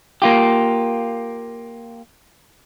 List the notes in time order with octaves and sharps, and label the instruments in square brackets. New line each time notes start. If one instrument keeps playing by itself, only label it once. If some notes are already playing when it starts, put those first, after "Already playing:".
[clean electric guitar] A#3 F4 G4